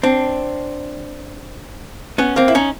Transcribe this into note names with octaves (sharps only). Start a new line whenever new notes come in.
C4 D4
B3 C#4
A#3 C4
E4
C#4 D#4